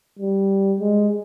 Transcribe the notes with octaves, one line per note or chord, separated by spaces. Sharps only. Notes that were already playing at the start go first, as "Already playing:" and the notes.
G3
G#3